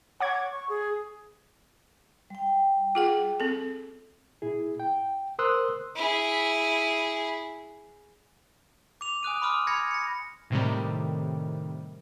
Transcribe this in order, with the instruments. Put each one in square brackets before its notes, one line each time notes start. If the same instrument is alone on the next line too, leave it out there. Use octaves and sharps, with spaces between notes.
[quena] C#5 [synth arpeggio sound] F#5 D6 G#6
[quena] C#6
G#4
[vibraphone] G3 G5
[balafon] F4 G#4 F#5
C4 A4
[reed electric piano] A#2 E4 G#4
G5
A#4 C5 C6 D#6 E6 F#6
[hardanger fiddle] E4 G#4
[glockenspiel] D6 F7
G#5 D#6 F#6 D#7
B5 C6 D6 D#6 F6
B5 G#6 A#6 C#7
A#6 C#7
[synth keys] A2 C3 D#3 G3